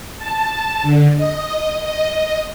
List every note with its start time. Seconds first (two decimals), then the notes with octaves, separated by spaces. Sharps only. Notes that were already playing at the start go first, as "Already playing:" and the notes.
0.17 A5
0.82 D3
1.15 D#5
1.80 D#5